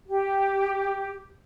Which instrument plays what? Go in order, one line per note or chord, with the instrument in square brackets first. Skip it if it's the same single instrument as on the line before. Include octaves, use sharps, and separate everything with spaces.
[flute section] G4